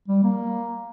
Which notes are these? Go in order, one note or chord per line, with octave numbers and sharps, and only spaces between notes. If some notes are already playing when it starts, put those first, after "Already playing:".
G3
A#3